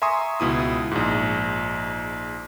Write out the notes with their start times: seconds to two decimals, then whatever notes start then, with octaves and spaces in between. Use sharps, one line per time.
0.02 E5 G#5 A#5 C6 C#6 D#6
0.40 C#2 B2 E4 D#6
0.91 A#1 G#2